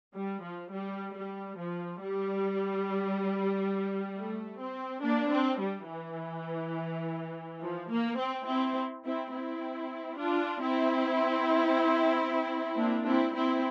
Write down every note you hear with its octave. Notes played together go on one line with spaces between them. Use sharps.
G3
F3
G3
G3
F3
G3
A3
C4
A#3 D4
C4
G3
E3
F3
A#3
C4
C4 E4
C4 E4
C4 E4
D4 F4
C4 E4
A#3 D4
C4 E4
C4 E4